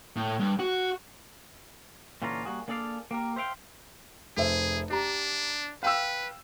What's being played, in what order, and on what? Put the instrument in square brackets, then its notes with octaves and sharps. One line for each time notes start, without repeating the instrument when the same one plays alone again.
[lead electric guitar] A2
G2
F#4
[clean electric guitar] A#2 D3 E3 C#4 F4 A#5
G3 A#3 F#4 G#4
A#3 D4 G#4 A4 D5 F5
A#3 G4 A#4
C5 E5 F5 G5
[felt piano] F1 C5 E5 [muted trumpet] G#4
[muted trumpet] D4 [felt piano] G4 A#5
[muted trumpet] B4 [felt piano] F5 G5 E6